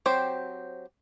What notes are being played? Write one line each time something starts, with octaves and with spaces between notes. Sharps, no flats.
F#3 C4 G4 C5